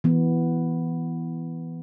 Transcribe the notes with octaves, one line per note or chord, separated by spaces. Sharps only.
E3 B3